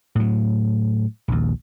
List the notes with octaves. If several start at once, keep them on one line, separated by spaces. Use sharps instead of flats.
A2 F#3
A#1 D#2